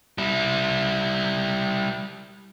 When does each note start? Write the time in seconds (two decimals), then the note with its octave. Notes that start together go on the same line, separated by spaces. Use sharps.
0.18 G3 E4